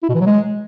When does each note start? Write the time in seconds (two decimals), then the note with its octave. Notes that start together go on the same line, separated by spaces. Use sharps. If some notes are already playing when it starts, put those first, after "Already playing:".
0.03 E4
0.09 B2
0.15 E3
0.21 F#3
0.26 G#3